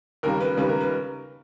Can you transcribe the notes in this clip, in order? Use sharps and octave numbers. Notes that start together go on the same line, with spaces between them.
D#2 C#3 G3 A#4
B4
D#2 C#3 G3 B4
A#4
B4